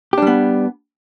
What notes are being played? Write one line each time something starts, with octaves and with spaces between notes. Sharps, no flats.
G3 B3 D4 G4